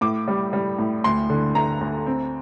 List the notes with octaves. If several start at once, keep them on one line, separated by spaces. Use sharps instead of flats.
A2 D6
G3
G3
A2
D2 C6
D3
A3 A#5
D2
C4